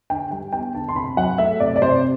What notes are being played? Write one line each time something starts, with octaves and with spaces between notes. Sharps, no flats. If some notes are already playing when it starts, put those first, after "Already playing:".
D3 G5
G3 G5
B3 G5
D3 A5
C6
C3 B5
F#3 F#5
A3 E5
C3 D5
D5
C3 C5